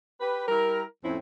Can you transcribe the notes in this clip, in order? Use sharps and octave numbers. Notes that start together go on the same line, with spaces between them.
G4 B4
G3 E4 A#4
F2 A2 C4 C#4 E4